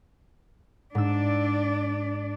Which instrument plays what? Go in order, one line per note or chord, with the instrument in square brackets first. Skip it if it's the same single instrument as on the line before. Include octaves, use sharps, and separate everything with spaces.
[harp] G#2 E6 [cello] D4 D5